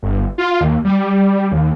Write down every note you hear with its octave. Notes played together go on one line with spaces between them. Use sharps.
G1
F4
D#2
G3
D#2